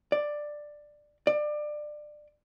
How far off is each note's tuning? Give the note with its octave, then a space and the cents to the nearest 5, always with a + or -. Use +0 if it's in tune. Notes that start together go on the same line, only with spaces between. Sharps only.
D5 +10
D5 +25